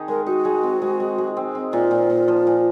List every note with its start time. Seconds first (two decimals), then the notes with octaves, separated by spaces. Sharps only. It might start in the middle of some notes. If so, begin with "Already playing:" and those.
Already playing: D#3 D#4 G#4
0.08 G#3 A#4
0.26 D#4 F#4
0.45 G#3
0.63 C4
0.82 G#3
1.00 G#3
1.18 G#3
1.37 C4
1.55 C4
1.73 A#2 F4
1.91 A#2
2.10 A#2
2.28 F3
2.47 A#2